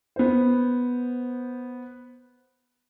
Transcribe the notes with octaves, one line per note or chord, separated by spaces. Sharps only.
B3 C5